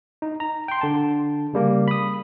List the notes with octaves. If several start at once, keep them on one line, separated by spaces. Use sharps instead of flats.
D#4
A#5
G5 C6
D3 A5
C#3 G3 A#3
B5 D#6